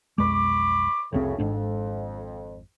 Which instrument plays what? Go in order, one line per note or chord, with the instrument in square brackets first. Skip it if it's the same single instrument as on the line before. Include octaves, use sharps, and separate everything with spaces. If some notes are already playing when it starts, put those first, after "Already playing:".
[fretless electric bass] B1 F2 G#3 [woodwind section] B5 C#6 D6
[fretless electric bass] F1 C2 C4 [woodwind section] F#2 A2 C#3
[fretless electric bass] G#1 G#2 D4 [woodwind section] F2